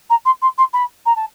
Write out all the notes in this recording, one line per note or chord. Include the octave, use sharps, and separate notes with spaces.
A#5
C6
C6
C6
B5
A#5
A5